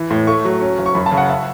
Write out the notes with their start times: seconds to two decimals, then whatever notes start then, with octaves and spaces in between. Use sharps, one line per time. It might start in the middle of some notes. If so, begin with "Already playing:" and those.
Already playing: E3
0.11 A2
0.27 A3 C#6
0.45 F#3
0.61 C#4
0.79 F#1
0.86 C#6
0.95 F#2 B5
1.06 A5
1.12 C#3
1.17 F#5
1.29 E5